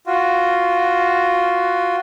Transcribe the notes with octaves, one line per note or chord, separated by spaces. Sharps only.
F4 F#4